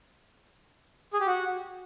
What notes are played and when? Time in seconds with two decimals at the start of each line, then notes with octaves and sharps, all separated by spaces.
1.13 G#4
1.20 G4
1.27 F#4